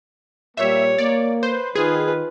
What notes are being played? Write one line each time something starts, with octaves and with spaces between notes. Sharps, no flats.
A#2 G3 A#3 C#5 E5
A#3 D5
B4 C5
D#3 F4 G#4 B4